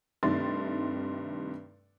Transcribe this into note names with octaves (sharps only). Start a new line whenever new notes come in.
G2 C3 D#3 A3 C6 A6